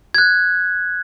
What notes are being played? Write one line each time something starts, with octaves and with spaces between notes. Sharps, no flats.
F#6 G#6